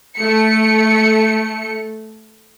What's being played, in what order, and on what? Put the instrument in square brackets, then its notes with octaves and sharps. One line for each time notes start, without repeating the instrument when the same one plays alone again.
[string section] A3 C#7